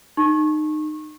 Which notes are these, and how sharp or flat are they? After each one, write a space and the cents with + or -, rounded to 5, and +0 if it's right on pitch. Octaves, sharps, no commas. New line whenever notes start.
D#4 -25 C#6 -25